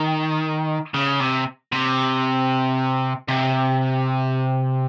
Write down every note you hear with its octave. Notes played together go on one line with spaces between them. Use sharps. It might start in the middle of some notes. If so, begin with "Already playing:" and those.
Already playing: D#3
C#3
C3
C3
C3